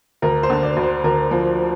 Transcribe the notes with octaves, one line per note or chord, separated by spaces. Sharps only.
D2 A#4
C5
D3
D5
D2
C5
D2 A#4
F3